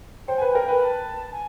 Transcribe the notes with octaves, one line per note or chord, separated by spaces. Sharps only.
C5 G5
B4 G#5
G#5
A#4 G5
B4
B5
A5
G#5